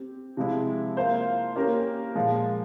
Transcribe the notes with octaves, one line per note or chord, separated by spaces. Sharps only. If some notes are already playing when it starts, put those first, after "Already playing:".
Already playing: C4 G4
C3 F3 G#3 E4
A#3 F4 C5 F5
A#3 C#4 G4 A#4
A#2 F3 G#3